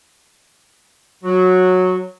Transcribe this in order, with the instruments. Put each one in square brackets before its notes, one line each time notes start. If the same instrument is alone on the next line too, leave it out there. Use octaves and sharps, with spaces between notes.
[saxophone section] F#3